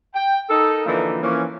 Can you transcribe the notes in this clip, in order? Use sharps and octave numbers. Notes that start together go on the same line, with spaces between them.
G5
D#4 A4 A#4
D3 E3 F3 A#3 D#4 E4
E3 F3 A#3 C#4